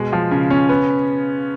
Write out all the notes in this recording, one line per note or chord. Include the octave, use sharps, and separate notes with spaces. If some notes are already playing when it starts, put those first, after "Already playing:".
Already playing: B2 G#3
F3
C#3
C#4
B3